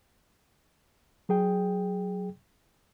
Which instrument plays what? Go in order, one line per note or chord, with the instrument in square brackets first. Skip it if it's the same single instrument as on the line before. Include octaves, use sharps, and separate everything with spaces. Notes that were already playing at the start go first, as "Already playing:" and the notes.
[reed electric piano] F#3 G#4 G5